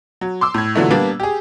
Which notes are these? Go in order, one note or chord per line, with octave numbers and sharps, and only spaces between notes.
F#3
C6 D6 E6
A2 G#6
A#2 D3 E3 F#3 A3
G3 A#3 B3 D4
G4 G#4